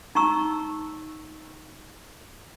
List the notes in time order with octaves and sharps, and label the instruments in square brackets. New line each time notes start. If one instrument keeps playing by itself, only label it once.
[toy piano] D#4 A#5 C#6 E6